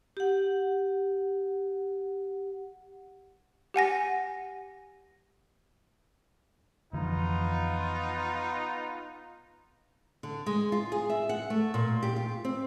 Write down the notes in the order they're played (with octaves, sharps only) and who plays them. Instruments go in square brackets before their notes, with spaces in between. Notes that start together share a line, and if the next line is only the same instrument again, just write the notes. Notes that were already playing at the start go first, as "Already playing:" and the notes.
[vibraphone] G4 F#5
[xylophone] G4 F#5 G#5 A#6
[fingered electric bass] F2 D3 E3 [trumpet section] B3 D#4 F4
[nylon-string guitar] D3
G#3
F4
G#4
E5
F#5
A3
A#2
G4
F4
C4